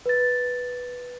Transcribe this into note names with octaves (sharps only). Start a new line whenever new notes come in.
B4 A6